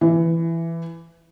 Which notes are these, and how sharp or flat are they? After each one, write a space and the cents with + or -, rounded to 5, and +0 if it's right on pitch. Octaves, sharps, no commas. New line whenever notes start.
E3 +10